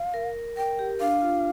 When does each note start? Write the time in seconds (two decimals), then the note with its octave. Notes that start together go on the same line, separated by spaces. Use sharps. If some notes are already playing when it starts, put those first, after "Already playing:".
Already playing: F5
0.14 A#4
0.57 A#4 G5
0.79 G4
1.01 D4 F5
1.22 F4